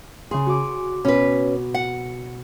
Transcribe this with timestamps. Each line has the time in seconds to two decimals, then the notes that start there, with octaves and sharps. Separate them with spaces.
0.31 C#3 G#4 C6
0.46 F#4 D6
1.05 B2 C#4 B4
1.74 F#5